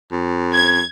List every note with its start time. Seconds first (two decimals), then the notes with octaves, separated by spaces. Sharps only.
0.11 F2
0.54 G#6